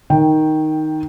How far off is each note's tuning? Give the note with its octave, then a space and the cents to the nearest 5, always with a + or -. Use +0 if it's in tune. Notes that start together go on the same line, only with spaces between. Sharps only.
D#3 +0 G5 +0